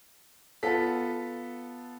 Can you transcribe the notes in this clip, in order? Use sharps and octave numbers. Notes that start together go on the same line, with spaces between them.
B3 F4 A4 B6